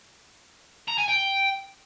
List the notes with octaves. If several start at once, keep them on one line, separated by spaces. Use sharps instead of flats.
A#5
G#5
G5